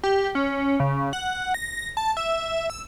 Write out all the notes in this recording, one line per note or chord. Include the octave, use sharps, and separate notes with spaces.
G4
C#4
C#3
F#5
A#6
A5
E5
E6